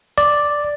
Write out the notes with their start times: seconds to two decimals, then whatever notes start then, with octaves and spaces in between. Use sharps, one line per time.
0.18 D5